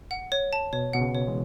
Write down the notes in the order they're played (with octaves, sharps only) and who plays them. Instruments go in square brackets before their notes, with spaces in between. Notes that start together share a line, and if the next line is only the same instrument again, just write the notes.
[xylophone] F#5
C#5
A5
[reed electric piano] B2 [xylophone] C#5
[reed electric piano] B2 [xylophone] F#5
[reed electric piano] C#3
[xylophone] C#5
[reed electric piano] E3 G#3